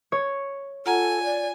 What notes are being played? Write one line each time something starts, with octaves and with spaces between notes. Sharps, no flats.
C#5
F4 A4 F#5 G#5 A#5
D5